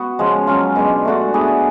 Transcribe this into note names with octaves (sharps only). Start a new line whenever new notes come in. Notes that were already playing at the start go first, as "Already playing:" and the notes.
Already playing: B3 F#4
C#3 F3 G#3
F#3 C#4 F4
B2 G#3 D4
A3 D4 F#4
B3 D4 G#4